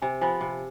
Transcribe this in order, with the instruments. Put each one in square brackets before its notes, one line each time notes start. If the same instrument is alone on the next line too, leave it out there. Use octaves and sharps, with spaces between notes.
[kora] C3 [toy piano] G#5
[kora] F3 B3 [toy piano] G#5
[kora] C3